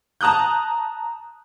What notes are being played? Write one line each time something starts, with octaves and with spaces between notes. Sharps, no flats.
A5 A#5 D#6 F#6 G6